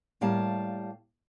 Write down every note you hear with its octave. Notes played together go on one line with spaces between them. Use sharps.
A2 G3 A#3 F5 A5